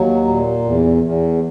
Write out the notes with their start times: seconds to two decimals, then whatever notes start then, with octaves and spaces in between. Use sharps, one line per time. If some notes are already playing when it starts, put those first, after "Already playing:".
Already playing: D#2 F#3
0.28 A#2
0.65 E2
1.03 E2